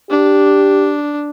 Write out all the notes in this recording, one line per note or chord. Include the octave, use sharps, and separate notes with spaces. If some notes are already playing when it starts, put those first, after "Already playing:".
D4 G4